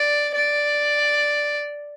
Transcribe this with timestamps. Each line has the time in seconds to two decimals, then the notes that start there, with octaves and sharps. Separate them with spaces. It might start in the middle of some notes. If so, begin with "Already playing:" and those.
Already playing: D5
0.35 D5